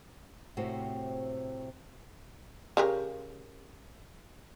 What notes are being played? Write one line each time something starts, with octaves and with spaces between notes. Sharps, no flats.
A2 C3 C4 F#4
C#3 G4 A#4